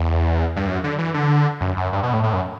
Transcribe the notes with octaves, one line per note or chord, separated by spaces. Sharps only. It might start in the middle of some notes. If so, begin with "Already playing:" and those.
Already playing: E2
G2
F#2
D3
E3
D3
F#2
F#2
G2
B2
A2
A2
F#2